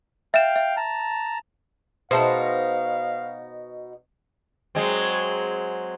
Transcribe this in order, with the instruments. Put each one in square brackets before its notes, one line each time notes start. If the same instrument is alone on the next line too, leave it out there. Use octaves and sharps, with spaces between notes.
[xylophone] E5 E7 [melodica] F5 G5
[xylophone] E5
[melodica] A5 A#5
[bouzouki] B2 D#4 [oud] F#4 C5 [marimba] G#4 E5 A5 [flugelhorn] F5
[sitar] F#3 G#3 C4